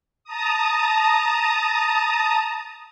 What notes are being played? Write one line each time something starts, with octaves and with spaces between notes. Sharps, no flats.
A5 A#5 D#6